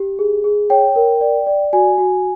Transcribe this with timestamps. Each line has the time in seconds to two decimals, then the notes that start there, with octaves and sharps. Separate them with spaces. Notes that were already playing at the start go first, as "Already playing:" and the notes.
Already playing: G4
0.19 G#4
0.44 G#4
0.70 C#5 G5
0.96 A#4
1.21 D5
1.47 D5
1.73 F#4 G#5
1.98 F#4